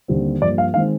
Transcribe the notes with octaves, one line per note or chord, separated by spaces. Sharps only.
D#2 D3 G3 C4
G2 F3 A#3 D5
F5
D#3 G#3 C4 F5